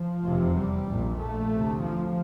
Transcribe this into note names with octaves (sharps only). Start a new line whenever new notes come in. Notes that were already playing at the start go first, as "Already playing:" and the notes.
Already playing: F3
F1 E2 C3
G3
A#1 A#2
A3
D2 C3
F3